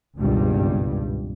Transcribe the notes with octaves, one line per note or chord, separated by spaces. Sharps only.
G#1 C#2 G2 B2 G3